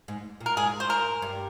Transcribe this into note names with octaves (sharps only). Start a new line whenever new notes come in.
G#2
A#2
A#4
G#2 G#4
C5
A#4
G2